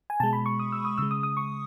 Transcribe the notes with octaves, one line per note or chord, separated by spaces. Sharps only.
G#5
B2 G#3 A5
B5
C#6
D#6
E6
D#6
C#3 G#3 E6
D#6
D#6
C#6